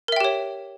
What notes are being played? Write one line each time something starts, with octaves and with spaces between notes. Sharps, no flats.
G4 A#4 C#5 E5 G5